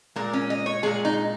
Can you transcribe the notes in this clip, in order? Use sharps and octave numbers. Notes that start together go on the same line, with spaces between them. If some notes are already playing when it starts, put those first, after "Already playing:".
A#2 G#3 A#4
C#4
D#5
C#5
A#2 G#3 G#4
D#4